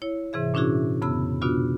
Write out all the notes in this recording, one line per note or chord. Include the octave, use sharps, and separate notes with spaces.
E4 C#5
G#2 C3 E3 G#4 E5
A#2 C#4 D4 E4 F#4 G#4
F2 C#3 B3 B5 E6
B2 B3 D4 F4 F#4